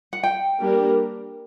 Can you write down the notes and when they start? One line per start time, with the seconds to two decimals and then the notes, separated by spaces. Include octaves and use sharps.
0.13 F#5
0.23 G5
0.60 G3 A#3 D4 A#4